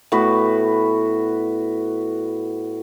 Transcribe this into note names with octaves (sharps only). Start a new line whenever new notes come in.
A2 B3 F#4 B4